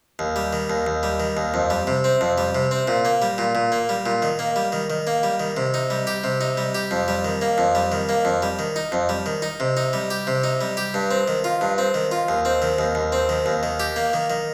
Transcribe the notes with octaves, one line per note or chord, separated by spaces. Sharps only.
D#2
G3
D#3
D#2
D#2
G3
D#3
D#2
F2
G3
C3
C4
F2
G3
C3
C4
A#2
A#3
G3
A#2
A#2
A#3
G3
A#2
D#3
A#3
G3
D#3
D#3
A#3
G3
D#3
C3
D#4
G3
G4
C3
D#4
G3
G4
F2
G3
D#3
A#3
F2
G3
D#3
A#3
F2
G3
D#3
D#4
F2
G3
D#3
D#4
C3
D#4
G3
G4
C3
D#4
G3
G4
G2
C4
D#3
F4
G2
C4
D#3
F4
D#2
C4
D#3
D#2
D#2
C4
D#3
D#2
D#3
G4
A#3
D#3
D#3